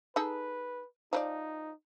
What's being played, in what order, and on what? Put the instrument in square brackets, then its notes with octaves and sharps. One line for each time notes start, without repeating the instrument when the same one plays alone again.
[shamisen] D#4 G#4 A4 [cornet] B4
[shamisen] F3 B4 D5 [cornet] D#4